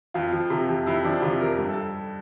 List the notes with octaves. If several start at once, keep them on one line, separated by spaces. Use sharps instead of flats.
F2 F4
F3
C3
F2
F2 E4
F3 D4
C3 F4
F2 A#4
G2
A4